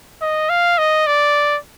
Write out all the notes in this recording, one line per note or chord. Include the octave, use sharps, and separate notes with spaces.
D#5
F5
D#5
D5